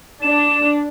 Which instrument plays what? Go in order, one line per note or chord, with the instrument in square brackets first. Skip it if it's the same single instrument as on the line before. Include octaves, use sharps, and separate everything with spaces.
[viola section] D4 [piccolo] E7